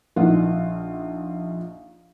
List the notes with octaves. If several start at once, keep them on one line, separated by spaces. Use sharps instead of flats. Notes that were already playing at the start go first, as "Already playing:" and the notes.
A#1 D#4 F4 F#5